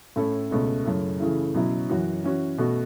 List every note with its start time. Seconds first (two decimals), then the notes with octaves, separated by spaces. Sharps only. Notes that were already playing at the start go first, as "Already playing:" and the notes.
0.16 A2 A3 C#4 E4 A4
0.51 C#2 B2 A3 C#4
0.85 F#2 C#3 A3 E4 A4
1.20 C#3 E3 A3 E4
1.54 B2 F#3 C#4 E4
1.90 F#2 E3 C#4 F#4
2.24 E3 C#4 F#4
2.58 B2 A3 F#4